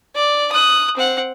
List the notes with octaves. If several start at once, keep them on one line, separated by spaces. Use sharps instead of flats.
D5
D#6 F#6
C4 F#5